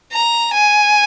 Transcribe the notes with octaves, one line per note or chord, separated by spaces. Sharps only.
A#5
G#5